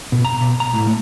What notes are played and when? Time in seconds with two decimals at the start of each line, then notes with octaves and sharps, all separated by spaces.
0.12 B2
0.25 A#5
0.41 B2
0.60 A#5
0.73 A2
0.87 A3